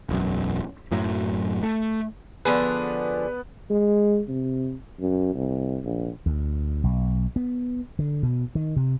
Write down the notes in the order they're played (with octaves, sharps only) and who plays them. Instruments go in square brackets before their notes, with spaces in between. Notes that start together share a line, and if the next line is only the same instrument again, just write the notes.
[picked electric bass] E1 B1 F#2
F#2 A2 F#3
A3
[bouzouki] D3 F3 G#4 [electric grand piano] B3 B4
[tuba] G#3
C3
F#2
C2
A#1
[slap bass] D2
B1
B3
D3
B2
D#3
C3